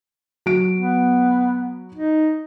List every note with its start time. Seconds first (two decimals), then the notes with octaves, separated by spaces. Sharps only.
0.46 F#3 D7
0.76 B3
1.94 D#4